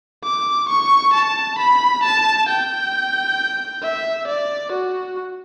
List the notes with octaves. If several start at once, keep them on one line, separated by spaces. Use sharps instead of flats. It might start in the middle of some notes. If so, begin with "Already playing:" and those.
D6
C#6
A5
B5
A5
G5
E5
D5
F#4